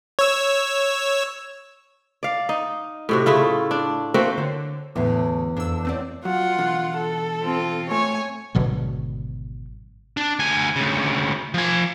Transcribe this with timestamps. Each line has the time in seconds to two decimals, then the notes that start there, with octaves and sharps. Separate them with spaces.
0.19 C#5 E6
2.23 D5 F5
2.49 D#4
3.09 A2 C3 F#4
3.26 C#3 A3 E4 F4
3.71 D4
4.14 A3 A#3 C4 F#4
4.38 D3 C5
4.96 E2 A2 D3 G#3
5.57 F2 D4 E6
5.85 A3 C4 B4 D5 F#5
6.25 F#3 F4 F#5
6.58 B2 D3 E3
6.97 A4
7.43 C4 F4
7.91 A3 C#5 G#5
8.55 G#1 B2 D3 F#3
10.17 D4
10.39 D2 G#5
10.76 D2 C#3
11.54 F3 G#5